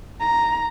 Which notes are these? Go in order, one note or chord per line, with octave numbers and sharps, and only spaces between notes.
A#5